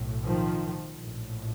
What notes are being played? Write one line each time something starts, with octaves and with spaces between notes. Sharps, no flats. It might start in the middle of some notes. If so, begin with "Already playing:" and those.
Already playing: B1 A2
D#3 F3
A#1 A2